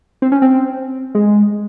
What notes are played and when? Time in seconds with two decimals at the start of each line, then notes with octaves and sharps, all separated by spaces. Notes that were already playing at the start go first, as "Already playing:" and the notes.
0.22 C4
0.32 C#4
0.42 C4
1.15 G#3